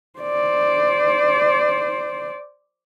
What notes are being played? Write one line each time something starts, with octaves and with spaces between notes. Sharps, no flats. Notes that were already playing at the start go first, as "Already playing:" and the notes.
C5 D5